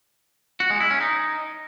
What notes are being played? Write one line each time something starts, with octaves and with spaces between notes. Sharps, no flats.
F#4
G#3
E4
C#4
D#4